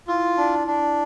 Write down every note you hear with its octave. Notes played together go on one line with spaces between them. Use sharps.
E4 F4
D4
D4